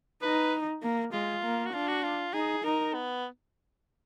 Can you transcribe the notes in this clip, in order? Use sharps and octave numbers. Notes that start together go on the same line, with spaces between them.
D#4 B4
A#3
G#3 F4
A#3
F#4
D4 F4
F#4
F4
D#4 G#4
D#4 A#4
B3